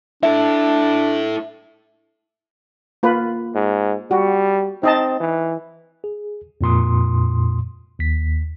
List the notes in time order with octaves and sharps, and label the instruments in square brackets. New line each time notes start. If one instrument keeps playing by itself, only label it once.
[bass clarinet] D4 [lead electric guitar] E4 A4 [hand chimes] E5
[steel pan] A#3 F4 B4
[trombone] G#2
[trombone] G3 [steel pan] F#4
[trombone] C4 [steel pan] D#4 D#5 A5
[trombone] E3
[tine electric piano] G#4
F2 A#2 C6 D#6
D#2 B6